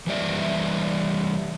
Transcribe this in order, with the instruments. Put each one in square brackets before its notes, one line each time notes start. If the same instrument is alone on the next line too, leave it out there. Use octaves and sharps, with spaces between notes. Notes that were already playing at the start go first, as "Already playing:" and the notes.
[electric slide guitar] E3 G3 D5 E5